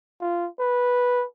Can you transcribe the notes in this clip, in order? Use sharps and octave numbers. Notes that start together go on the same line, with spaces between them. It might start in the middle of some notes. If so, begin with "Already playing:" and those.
F4
B4